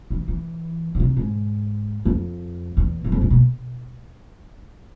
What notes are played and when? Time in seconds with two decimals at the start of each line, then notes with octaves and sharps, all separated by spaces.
0.10 E3
0.28 E3
0.95 D3
1.00 C3
1.17 G#2
2.05 F2
2.77 E2
3.04 E2
3.12 F2
3.21 G#2
3.30 B2